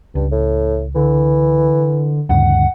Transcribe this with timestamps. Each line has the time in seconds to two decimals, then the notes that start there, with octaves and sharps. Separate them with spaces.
0.15 C#2 G2
0.31 A2
0.95 D3 E3
2.29 D2 G2 C#3 F#5